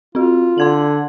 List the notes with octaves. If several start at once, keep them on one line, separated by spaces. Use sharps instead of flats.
C4 F4 F#4
D3 C6 G#6 F#7